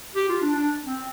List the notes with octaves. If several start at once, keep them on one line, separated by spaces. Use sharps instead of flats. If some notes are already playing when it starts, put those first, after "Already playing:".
G4
F4
D4
D4
C4